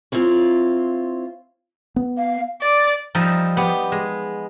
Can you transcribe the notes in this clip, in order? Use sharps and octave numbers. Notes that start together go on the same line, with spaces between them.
C4 E4 F4 C#5
B3
F5
D5
F3 G3 D#4 D#5 E5
B3 G4
G#3